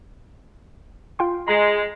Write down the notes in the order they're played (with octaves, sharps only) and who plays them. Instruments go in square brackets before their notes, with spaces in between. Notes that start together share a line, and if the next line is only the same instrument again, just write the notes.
[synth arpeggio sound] F4 G5 C6
[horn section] G#3 [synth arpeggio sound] A#5